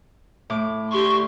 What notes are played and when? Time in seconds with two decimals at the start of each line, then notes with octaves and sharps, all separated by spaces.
0.50 A2 D6
0.91 D3 G4 C6 C#6